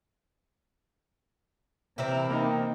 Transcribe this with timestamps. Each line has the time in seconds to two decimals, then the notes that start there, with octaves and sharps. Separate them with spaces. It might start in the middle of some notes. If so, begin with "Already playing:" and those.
1.98 C3 E3 C4 E4 A#4
2.30 A#3 D#4